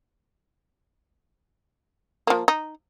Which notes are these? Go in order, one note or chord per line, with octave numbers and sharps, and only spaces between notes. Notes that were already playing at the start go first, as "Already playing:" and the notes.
F3 A#3
D#4